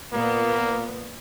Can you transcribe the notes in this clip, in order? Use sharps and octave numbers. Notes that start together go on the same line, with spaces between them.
A#2 A#3 B3